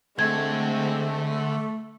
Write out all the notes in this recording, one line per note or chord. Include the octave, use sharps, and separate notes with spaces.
D3 G#3 A3 C4 G#6